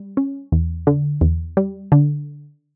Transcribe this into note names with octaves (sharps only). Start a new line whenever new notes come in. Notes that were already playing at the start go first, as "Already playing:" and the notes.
Already playing: G3
C#4
E2
D3
E2
G3
D3